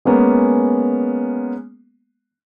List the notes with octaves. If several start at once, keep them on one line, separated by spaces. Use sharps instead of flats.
G#3 A#3 B3 C#4